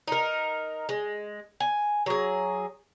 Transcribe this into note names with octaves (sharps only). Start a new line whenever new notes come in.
D#4 A#4
G#3
G#5
F#3 G#4